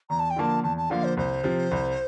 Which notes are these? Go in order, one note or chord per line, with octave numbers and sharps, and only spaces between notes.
E2 A#5
A5
G5
D3 F3 A#3 A5
E2 A5
A5
D3 F3 A#3 F5
C5
C2 C5
C3 F3
C2